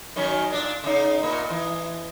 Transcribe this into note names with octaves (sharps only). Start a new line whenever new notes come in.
D#3 F#3 C#4
A#2 D4 D5
C#3 D#4
A#2 A#3
E3